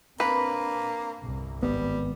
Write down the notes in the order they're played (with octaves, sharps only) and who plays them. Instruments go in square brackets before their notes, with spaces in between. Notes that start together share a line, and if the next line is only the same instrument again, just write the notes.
[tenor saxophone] A#3 [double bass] C4 D4 [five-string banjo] B4
[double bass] G1 C2
[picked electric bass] G#1 B3 [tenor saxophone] G3